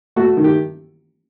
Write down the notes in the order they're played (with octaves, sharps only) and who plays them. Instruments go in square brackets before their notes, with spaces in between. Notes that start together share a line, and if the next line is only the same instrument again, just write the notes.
[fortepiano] A3 F#4
D#3
G4